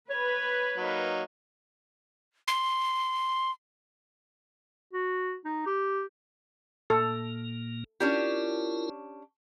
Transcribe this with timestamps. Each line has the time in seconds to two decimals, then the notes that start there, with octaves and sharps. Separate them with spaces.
0.10 B4 C#5
0.77 F#3 A#3 D#4
2.48 C6
4.93 F#4
5.45 D#4
5.66 G4
6.90 A#2 A#3 A4
8.00 C#4 D4 E4 F4 G4 A#4